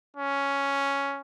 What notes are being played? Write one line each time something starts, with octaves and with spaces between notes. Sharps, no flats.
C#4